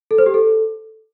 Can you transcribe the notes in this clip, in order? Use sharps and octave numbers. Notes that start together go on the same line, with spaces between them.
A4
C5
G4
A4